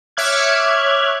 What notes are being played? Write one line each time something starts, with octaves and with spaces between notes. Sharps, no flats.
C#5 E5 D6 F6 F#6 G#6